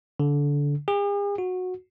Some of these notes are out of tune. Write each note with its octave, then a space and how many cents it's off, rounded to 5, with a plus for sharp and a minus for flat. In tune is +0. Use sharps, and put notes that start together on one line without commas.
D3 -20
G#4 -45
F#4 -15